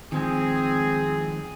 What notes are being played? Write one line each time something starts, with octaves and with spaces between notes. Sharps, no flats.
D#3 F3 G#3 C4 G#4